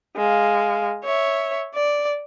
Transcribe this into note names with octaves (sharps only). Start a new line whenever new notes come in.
G#3 F5
C#5 E5
D5